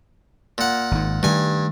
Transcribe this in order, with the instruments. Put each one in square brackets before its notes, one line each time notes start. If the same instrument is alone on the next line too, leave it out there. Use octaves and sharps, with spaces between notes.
[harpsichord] A#2 F#5
[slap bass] G#1 G#2
[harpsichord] G2 G#5 [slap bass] D#3 G3 A3